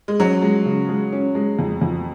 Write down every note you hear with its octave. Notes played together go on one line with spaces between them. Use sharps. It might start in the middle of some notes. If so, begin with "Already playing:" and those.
G#3
F#3 C#4
G#3
C#3
G#3
C#4
G#3
F2
F2